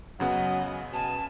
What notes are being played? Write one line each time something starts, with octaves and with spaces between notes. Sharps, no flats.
F#2 C#3 F#3 B3 D#5 F#5
B2 G#5 A5